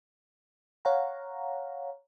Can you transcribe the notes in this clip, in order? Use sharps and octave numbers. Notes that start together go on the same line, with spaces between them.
C#5 F5 F#5 A#5